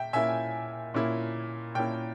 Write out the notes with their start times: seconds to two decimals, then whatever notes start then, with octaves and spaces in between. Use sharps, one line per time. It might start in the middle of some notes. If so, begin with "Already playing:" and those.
Already playing: A#2 E5 G5
0.13 A#2 A#3 C#4 E4 E5 G#5
0.94 A#2 A#3 C#4 E4
1.75 A#2 A#3 C#4 E4 G5